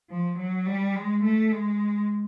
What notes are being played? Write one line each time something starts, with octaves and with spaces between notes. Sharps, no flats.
F3
F#3
G3
G#3
A3
G#3